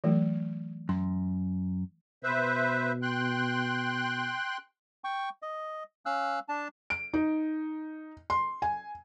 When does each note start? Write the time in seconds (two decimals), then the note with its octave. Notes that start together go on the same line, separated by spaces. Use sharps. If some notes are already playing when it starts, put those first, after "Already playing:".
0.04 E3 F#3 A3
0.89 F#2 C6
2.24 B2 B4 C5 E5
3.02 G5 C6 F#6
5.04 G5 C#6
5.42 D#5
6.06 C#4 F5 E6 F#6
6.49 D4 A5
6.90 D7
7.13 D#4
8.30 C6
8.62 G#5